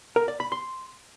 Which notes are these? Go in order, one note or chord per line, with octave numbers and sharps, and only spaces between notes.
A#4
D5
B5
C6